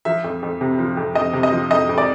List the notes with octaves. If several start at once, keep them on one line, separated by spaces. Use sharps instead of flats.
F3 E5
F2
F2
C3
F3
F2
F2 D#5
C3
D#5
F3
F2 D#5
F2
D5